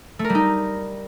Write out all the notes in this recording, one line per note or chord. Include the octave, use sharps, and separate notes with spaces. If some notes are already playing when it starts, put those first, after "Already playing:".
A3
A#4
G3
D#4